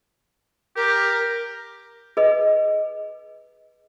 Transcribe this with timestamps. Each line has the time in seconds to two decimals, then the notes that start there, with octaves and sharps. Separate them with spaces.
0.76 G4 A#4
2.17 G#4 B4 D#5